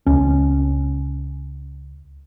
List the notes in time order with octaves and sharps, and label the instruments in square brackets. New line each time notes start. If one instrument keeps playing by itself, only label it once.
[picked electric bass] C#2 C#4